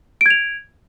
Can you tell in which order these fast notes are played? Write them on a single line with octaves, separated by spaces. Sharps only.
D7 G#6 F7